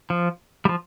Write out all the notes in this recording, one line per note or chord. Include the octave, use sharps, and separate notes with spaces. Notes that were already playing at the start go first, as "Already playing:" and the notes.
F3
G3
F3